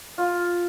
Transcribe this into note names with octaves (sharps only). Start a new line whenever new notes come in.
F4